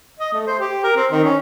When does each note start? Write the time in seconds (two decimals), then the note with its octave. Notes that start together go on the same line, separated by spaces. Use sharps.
0.19 D#5
0.34 A3
0.47 C5
0.60 G4
0.84 A#4
0.96 C4
1.12 D#3
1.24 C#4